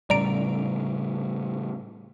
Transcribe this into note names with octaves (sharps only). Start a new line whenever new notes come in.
A2 C#3 G3 D5 A#5 D7